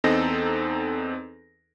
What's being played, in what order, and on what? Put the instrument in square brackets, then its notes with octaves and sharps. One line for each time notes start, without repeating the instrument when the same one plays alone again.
[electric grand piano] E2 C4 D#4 A4 D#5 A#6